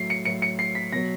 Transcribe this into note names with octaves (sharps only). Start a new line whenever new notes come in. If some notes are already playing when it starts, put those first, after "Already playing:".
Already playing: A2 F#3 C7
C#7
A2 F#3 C#7
C#7
C7
B6
B2 F#3 A#6